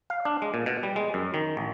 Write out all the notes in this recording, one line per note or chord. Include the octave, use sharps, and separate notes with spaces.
F5
D4
G#3
A#2
B2
G3
G#3
F#2
D#3
A1